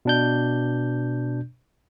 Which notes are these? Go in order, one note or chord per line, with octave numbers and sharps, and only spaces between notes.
B2 D4 G6